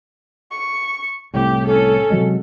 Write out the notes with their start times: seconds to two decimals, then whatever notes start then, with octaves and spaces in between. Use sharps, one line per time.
0.51 C#6
1.34 C2 A2 G4
1.66 C#4 A4
2.10 C3 F#3 G#3